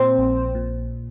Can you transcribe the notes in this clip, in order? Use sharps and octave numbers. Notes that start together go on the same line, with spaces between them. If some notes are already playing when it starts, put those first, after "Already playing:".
Already playing: A#2 C4 C5
A#1
A#2